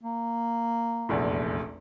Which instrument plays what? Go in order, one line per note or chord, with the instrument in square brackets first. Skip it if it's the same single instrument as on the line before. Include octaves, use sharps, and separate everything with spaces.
[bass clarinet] A#3
[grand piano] F1 A#1 E2